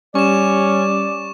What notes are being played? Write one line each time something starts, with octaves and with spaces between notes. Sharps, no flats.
G3 C#4 D5 C#6 E7